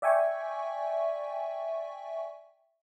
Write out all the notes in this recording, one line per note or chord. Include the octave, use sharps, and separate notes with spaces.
D5 E5 G5 G#5 C#6